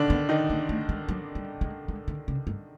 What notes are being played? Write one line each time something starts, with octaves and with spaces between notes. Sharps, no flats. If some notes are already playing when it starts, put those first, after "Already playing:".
Already playing: D3 D#3 D4
B3
D#3 D#4
A#3
A3
G#3
F#3
G3
G#3
G#3
D3
C#3
G2